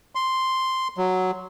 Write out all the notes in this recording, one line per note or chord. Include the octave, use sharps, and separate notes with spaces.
C6
F#3